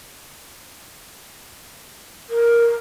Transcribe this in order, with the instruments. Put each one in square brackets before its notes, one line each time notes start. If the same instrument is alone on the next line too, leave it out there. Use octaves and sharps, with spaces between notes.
[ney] A#4